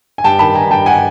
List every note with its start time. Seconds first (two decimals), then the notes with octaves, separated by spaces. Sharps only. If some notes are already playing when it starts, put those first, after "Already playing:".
0.18 G#5
0.24 G2 G5 A5
0.39 D#3 A5 B5
0.55 G2 G#5 A#5
0.71 G2 G5 A5
0.86 F#5 G#5